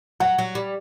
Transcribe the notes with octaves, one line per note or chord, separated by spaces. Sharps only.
F#3 F#5
F#3
G3